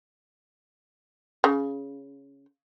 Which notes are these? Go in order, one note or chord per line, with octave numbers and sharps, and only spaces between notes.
C#3